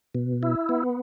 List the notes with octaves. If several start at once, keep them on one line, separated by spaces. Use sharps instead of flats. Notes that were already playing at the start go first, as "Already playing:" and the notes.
B2
E4
B3